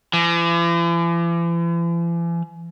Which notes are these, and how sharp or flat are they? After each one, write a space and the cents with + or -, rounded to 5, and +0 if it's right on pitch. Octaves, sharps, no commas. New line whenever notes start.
E3 +45